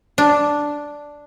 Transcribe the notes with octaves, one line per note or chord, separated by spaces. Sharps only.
D4